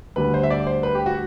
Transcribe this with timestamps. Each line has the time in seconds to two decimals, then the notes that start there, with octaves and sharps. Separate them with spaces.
0.16 D2 D3 G3 B4
0.34 C5
0.43 E5
0.50 D5
0.67 C5
0.83 B4
0.95 G4
1.06 F#4